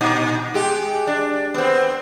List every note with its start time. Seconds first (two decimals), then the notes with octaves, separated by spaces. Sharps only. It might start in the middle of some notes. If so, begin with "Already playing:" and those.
0.01 A#2 D#4
0.54 G#3 G4
1.07 D4
1.54 B3 C4